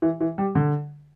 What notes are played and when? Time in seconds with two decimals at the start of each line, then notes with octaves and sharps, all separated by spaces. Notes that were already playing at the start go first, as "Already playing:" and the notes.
0.02 E3
0.21 E3
0.38 G3
0.55 D3